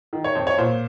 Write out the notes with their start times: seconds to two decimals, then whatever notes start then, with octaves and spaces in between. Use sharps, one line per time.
0.13 D#3
0.24 C#5
0.35 F2 C5
0.47 C#5
0.58 A#2 C5